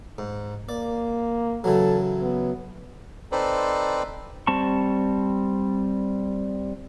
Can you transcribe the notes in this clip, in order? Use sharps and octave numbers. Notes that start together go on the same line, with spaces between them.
G#2
A#3 D5
C#3 E3 F#3 A4
B3
C4 D#4 A4 B4 C5 D5
G3 C4 A5 C#6